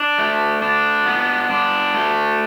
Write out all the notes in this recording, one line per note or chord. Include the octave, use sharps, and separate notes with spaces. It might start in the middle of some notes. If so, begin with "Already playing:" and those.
Already playing: D4
A3
D4
B3
D4
A3